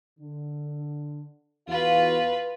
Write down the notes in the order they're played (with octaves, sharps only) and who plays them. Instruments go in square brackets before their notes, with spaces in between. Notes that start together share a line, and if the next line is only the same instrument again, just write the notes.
[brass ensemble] D3
[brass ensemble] E2 F#4 F5 [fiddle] F4 B4